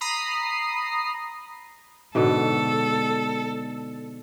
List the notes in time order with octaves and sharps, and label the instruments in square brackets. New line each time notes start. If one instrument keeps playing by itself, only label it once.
[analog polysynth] A#5 B5 D#6 C7
[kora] G#2 B2 D3 [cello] A4